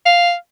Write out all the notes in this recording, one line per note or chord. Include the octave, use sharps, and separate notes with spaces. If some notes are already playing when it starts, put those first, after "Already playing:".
F5